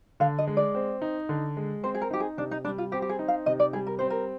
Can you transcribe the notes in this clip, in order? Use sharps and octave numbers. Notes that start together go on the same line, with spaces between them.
D3 F5
D#5
G#3
D5
C4
D#4
D3
G#3
C4 C5
G#4
A#4
D#4 G4
G#4
C3 D4
D#4
G3 D4
F4
C4 G4
G4
G#4
D#4
F5
C3 D#5
D5
G3 G#4
A#4
C4 C5
A#4